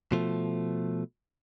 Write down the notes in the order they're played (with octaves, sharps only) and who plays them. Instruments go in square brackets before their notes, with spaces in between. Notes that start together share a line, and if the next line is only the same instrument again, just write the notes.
[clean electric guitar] B2 F3 A3